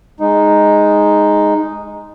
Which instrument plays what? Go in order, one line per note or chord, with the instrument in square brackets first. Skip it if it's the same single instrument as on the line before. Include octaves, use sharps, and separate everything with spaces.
[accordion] G#3 D#4